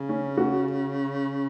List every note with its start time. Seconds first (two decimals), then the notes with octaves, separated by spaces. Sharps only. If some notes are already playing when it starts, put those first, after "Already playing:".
Already playing: C#3
0.09 C#4
0.37 F#4